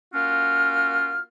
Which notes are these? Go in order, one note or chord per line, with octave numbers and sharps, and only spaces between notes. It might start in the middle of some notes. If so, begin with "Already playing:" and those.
A#3 C#4 F4 F#4 F6